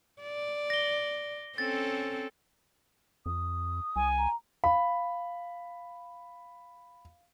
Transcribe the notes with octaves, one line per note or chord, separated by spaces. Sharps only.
D5
A#6 G7
C4 C#4 A4 A6
F2 D#6
C2 G#5
A#5
F5 B5